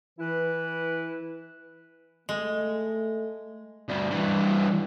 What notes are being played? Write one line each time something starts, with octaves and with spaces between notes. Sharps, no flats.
E3 E4 B4
G#3 A3
D2 G2
G2 E3